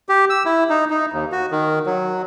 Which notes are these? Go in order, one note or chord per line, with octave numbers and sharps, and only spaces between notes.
G4
E6
E4
D#4
D#4
D#2
F#4
D#3
F#3